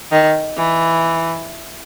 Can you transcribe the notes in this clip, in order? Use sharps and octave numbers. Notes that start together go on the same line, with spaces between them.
D#3
E3